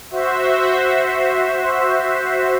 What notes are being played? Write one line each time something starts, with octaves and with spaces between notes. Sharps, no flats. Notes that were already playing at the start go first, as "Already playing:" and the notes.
F#4 C5 E5